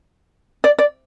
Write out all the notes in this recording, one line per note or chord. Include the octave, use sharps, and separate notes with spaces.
D5
D5